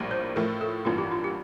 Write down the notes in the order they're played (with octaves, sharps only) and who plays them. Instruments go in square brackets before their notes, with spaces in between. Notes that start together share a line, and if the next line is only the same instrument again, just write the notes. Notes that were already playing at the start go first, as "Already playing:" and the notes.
Already playing: [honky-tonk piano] A#1 A2 G3 A#3
[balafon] C5
[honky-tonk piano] A2 F3 A3 [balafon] A#4
[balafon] A4
[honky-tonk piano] A1 G2 E3 A#3 [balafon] F4
[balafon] G4
F4
G4